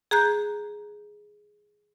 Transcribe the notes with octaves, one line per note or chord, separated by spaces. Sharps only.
G#4 A#5 F#6 G6